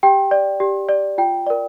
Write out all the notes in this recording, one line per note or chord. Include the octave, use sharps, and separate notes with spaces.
G4 G5
D5
G4
D5
F4 G5
A#4 D5